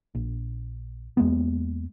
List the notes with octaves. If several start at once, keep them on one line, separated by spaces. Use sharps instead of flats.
A#1
E2 G#3 A#3 B3